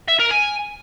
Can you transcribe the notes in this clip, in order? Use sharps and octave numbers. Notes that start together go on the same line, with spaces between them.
E5
A#4
G#5